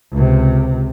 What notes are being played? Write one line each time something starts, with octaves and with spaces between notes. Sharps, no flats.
C#2 C3